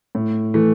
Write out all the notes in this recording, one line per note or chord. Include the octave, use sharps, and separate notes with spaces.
A2
E3 A3